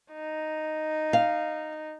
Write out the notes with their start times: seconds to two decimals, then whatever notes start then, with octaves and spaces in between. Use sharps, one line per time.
0.13 D#4
1.13 F5